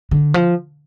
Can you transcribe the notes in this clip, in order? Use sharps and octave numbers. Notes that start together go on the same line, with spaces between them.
D3
F3